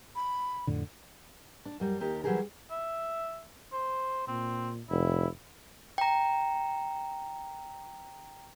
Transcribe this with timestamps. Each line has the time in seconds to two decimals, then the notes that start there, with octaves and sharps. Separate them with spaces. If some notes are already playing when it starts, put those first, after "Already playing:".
0.16 B5
0.67 F2 A2 D3
1.65 D4
1.80 F#2 G3 A#4
2.00 D#2 G4 A#4
2.24 E3 F#3 G3 G4 G#4 A#4
2.71 E5
3.73 C5
4.27 A#2 C4
4.90 F1 E4
5.98 G5 A#5